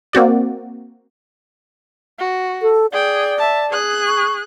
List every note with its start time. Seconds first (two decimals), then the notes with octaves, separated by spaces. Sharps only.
0.13 A#3 C4 F#4 D5
2.19 F#4
2.62 A4
2.92 G#4 D5 G5
3.38 E5 A5
3.70 G#4 F#6
4.07 C#6